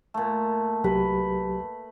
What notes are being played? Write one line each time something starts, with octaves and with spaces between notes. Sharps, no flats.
A#2 A3
C2 F#3 G4 B4